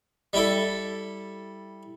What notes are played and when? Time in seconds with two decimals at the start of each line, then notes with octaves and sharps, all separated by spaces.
0.33 G3 E4 A4